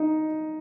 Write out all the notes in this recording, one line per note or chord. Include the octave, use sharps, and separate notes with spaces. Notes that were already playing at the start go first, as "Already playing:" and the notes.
Already playing: D#4